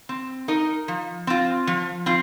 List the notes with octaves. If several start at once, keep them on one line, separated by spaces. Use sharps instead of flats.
C4
D#4 A#4 D#5
F3
C4 F4
F3
C4 F4